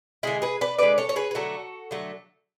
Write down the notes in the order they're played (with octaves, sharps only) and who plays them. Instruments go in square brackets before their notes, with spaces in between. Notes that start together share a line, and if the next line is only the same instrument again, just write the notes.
[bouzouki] D3 G#3 E4 G#4
G#4 B4
B4 D5
D3 G#3 B4 D5
A4 C#5
C#5
G#4 B4
B4
D3 F#3 A3 F#4 A4
D3 F#3 A3